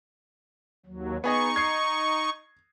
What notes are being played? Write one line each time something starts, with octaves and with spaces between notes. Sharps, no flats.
D#2 F#3
B3 D#4 G#4 D#5 C#6
G#6 C7